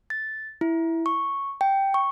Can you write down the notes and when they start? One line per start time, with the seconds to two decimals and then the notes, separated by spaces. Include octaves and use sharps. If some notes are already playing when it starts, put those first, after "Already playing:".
0.10 A6
0.61 E4
1.06 C#6
1.61 G5
1.94 C#6